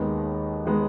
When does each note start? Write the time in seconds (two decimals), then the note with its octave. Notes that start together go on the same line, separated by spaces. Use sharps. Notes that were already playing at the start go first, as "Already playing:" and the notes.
Already playing: D#2 D#3 G#3 B3
0.65 D#3 G#3 B3